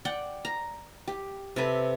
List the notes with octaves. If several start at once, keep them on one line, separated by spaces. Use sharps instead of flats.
D5 F#5 G5
A#5
G4
C3 A4 B4